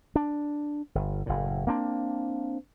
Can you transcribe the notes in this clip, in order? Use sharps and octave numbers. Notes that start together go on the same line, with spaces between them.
D4
G1
F#1 A2
A#3 C4 D4